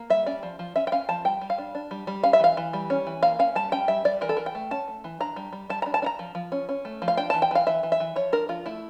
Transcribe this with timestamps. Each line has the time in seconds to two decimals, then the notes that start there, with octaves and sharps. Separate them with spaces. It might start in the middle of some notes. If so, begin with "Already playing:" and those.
Already playing: A#3
0.10 G3 E5
0.26 C#4 D5
0.43 F3
0.59 F3
0.76 C#4 E5
0.87 G5
0.92 C#4 F5
1.09 F3 A5
1.25 G3 G5
1.41 G3
1.50 F5
1.58 D4
1.75 D4
1.91 G3
2.07 G3
2.23 C#4 F5
2.33 E5
2.40 E3 F5
2.57 E3
2.73 G3
2.90 C#4
3.07 E3
3.23 A#3 F5
3.39 C#4 F5
3.55 G3 A5
3.72 C#4 G5
3.88 G3 E5
4.05 G3 D5
4.21 E3 A#4
4.29 A4
4.37 E3 A#4
4.46 G5
4.55 A3
4.71 C#4 A5
4.88 A3
5.04 E3
5.20 D4 A#5
5.36 G3
5.53 G3
5.70 G3 A5
5.82 A#5
5.86 D4
5.94 A5
6.02 D4
6.06 A#5
6.19 F3
6.35 F3
6.52 C#4
6.69 C#4
6.85 A3
7.02 F3
7.08 F5
7.17 D4 G5
7.30 E3 A5
7.42 G5
7.51 E3 F5
7.67 E3 E5
7.83 E3
7.92 E5
8.00 E3
8.16 F3 C#5
8.32 D4 A#4
8.49 F3 F4
8.66 A3 E4